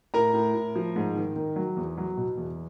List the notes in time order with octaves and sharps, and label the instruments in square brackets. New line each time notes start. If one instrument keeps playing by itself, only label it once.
[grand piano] A2 A#4 A#5
A2
A2
F3
G#2
D#3
D#3
F#3
E2
F#3
B2
E2